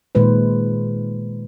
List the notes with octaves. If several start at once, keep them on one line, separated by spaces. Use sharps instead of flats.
A#2 D#3 G#3 B4 C5